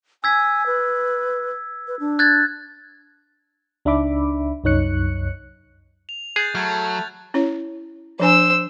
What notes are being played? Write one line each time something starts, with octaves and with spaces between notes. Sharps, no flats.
G#5 E6 G#6 B6
B4
B4
D4
F#6 G#6 A6
C#2 D4 D#4 E5 B5 D6
C2 F#2 D#4 C#5 F#6 C#7
F7
G#4 F#6 G6 A6
F#3 A3 A4 B5 F6 G#6 A6
C#4 E4 C#5
F3 D4 C5 G#5 E6